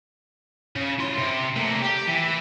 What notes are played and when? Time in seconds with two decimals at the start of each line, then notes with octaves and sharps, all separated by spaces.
0.76 C#3
0.99 E4 C6
1.18 C3
1.56 A2 A#3
1.82 G4
2.07 E3